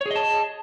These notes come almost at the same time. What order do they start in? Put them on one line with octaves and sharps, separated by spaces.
C#5 G#4 D#5 A5